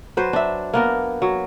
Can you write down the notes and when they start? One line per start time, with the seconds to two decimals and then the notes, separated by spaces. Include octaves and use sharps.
0.17 F#3 B4 C5
0.33 D4 E5
0.74 A#3 B3 A#4
1.22 F#3